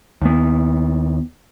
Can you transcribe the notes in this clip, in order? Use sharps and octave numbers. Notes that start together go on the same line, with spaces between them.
D#2 B3